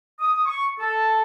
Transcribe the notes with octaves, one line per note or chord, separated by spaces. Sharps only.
D#6
C#6
A4